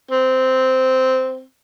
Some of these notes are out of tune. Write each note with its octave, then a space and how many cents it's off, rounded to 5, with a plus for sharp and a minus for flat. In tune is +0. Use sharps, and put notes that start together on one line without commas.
C4 -10